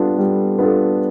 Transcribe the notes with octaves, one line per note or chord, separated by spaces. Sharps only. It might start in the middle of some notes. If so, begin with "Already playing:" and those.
Already playing: G3 B3 D4 F4 A4
G3
B3 D4 F4 A4